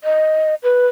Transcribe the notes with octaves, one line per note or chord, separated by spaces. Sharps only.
D#5
B4